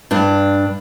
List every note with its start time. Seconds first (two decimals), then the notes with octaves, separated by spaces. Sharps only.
0.11 G2 D4